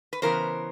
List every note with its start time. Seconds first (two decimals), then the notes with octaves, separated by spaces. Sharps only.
0.13 B4
0.22 C#3 E3 B3 A#4 C5